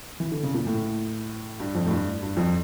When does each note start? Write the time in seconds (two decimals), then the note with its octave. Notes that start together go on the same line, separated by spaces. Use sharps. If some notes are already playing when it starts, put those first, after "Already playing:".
0.20 E3
0.32 D3
0.43 C#3
0.54 A#2
0.67 A2
1.60 G2
1.75 F2
1.86 A2
1.91 G2
2.22 G2
2.37 F2